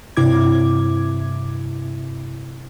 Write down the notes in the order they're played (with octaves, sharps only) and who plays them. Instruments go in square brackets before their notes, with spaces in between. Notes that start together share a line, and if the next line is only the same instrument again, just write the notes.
[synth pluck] G2 C3 E4 D6 G#6